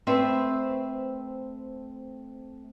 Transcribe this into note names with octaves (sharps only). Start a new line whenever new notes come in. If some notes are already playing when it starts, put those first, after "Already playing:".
A3 C4 B4 C5 E5